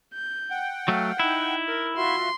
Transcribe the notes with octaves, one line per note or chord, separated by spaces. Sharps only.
G6
F#5 G5
F#3 A3 F5
D#4 E4
A#4
F4 F#4 E5 C6